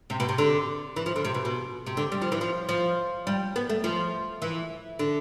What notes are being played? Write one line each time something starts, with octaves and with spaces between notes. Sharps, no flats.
C3
B2
C3
D3
E3
F3
D3
C3
B2
B2
C3
D3
G3
F3
E3
F3
F3
G3
B3
A3
F3
E3
D3